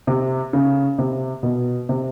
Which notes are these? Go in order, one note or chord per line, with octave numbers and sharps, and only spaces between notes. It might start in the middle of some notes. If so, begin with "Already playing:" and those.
C3
C#3
C3
B2
C3